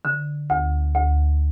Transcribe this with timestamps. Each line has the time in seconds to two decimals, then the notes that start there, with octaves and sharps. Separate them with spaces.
0.05 D3
0.50 D2
0.95 D2